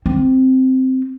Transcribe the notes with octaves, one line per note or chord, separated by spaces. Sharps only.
C4